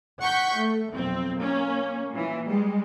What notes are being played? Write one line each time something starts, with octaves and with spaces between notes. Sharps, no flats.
F#5 C#6 G6 B6
A3
B1 F2 C4
A#3 C#4
A#2 E3
G3 G#3